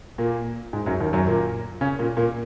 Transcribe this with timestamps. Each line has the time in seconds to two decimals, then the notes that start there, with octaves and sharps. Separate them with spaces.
0.18 A#2 A#3
0.73 G#2 G#3
0.86 F#2 F#3
1.00 D#2 D#3
1.13 F#2 F#3
1.27 A#2 A#3
1.81 C#3 C#4
1.99 A#2 A#3
2.17 A#2 A#3